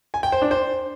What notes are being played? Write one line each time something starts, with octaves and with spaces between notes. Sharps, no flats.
G#5
G5
C5
D4
C5